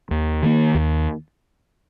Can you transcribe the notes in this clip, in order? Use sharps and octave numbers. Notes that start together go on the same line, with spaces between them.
D#2
D#3 A#3
D#2